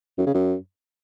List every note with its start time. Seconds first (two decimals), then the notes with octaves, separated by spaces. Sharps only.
0.18 F#2
0.26 C#3
0.34 F#2